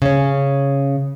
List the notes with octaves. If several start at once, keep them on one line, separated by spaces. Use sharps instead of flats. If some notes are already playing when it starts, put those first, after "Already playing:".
C#3 C#4